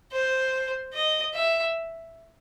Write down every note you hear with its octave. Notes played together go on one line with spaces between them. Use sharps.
C5
D#5
E5